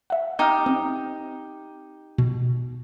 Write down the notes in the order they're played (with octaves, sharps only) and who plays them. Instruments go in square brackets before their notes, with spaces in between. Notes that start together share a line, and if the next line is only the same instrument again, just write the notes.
[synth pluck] E5 F#5
[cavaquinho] D#4 G4 [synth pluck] D#5 D#6 F6
[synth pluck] C4 D#6
B2